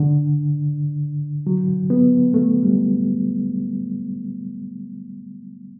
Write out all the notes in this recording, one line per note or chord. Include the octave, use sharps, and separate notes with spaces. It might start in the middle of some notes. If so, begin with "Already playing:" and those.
Already playing: D3
F#3
B3
A3
G3